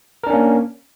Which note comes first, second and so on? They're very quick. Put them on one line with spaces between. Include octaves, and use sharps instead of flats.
A#4 D4 C#4 A#3